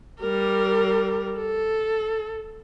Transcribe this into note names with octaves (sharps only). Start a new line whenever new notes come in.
G3 A#4
A4